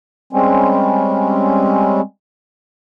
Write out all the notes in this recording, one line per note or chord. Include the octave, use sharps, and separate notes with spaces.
G3 G#3 C4 C#4